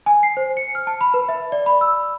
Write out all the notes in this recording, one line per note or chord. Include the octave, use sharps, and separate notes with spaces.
G#5
C7
C5
C#7
F6
A5
B5
B4
E5
D5
B5
E6